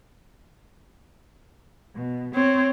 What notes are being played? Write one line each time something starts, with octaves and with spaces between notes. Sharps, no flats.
B2
C4 C#5